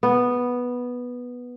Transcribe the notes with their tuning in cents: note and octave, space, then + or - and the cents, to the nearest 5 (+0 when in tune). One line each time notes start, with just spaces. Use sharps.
B3 -5